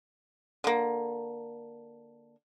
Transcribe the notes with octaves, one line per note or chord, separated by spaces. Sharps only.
D3 A#3